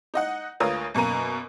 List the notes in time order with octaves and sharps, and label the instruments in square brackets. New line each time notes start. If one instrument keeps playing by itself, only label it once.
[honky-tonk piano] D#4 D#5 F#5
D2 F4 A#4 B4 C#5 D#6
F#2 B2 A#3 A#5 D#7